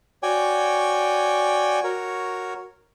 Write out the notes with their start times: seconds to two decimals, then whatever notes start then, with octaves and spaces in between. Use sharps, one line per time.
0.23 F#4 C#5 D5 G5 G#5
1.84 F#4 A#4 C#5